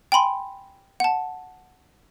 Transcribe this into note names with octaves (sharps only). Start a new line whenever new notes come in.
G5 G#5 B5 C6
F#5 A5